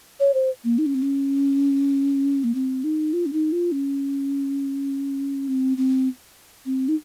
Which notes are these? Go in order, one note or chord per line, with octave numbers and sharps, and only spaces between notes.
C#5
C5
A#3
D#4
C#4
C4
C#4
A#3
C4
D#4
F4
C#4
D#4
F4
C#4
C4
C4
C4
D#4